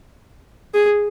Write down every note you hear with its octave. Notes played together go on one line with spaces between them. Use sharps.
G#4